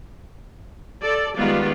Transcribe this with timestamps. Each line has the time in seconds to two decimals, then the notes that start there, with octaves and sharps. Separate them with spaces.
1.02 A4 D5
1.36 D#3 G3 G#3 B3 F4 D5